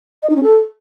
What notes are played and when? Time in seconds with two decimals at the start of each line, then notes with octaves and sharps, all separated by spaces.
0.23 D#5
0.29 D#4
0.36 C#4
0.43 A4